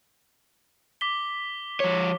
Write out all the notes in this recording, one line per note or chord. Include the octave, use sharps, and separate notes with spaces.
D6 B6 G7
F3 C#5